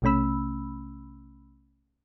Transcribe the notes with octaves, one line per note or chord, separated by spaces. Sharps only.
B1 C3 A3 C#4 B5 E6